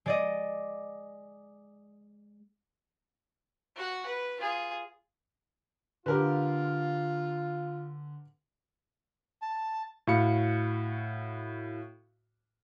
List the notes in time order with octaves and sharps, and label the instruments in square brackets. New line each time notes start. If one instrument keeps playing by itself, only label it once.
[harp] G#3 D5 D#5
[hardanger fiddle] F#4 F#5
B4
F4 G#4
[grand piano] D3 [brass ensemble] F4 [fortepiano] G4 A#4 B4
[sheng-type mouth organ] A5
[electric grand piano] A2 F#4 F5 B5 C#7